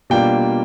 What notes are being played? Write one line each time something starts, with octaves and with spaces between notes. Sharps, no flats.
B2 G3 A#3 D4 F4 G5